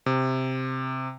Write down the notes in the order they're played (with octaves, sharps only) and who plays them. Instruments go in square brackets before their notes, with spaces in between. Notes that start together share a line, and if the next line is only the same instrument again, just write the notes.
[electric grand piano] C3